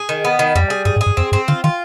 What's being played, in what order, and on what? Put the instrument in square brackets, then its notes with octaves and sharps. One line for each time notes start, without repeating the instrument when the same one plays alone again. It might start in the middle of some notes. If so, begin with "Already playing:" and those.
Already playing: [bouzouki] G#4
D#3
B3
D#3
[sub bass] F2 [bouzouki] G3
[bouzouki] G#4
[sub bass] G2 [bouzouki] G#4
[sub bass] G#2
[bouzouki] G#4
[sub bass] G2
[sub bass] F2 [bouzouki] C4
[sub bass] G2 [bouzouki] C4
[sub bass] D3 [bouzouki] F4
[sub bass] D#3 [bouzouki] F4